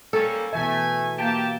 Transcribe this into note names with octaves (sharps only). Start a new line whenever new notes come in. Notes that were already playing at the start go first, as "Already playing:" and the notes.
G3 A#3 C#4 A4
B2 E3 A3 E5 G#5
A#3 G4 A5